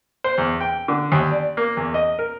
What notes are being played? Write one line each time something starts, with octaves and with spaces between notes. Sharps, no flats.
C5
E2
G5
D3
D#2
D5
A#3
E2
D#5
A#4